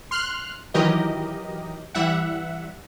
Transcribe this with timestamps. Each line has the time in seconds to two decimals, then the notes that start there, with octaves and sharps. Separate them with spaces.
0.11 C6 F6 F#6
0.74 D#3 E3 F#3 G4 A#4 D#5
1.94 E3 G3 E5 F#5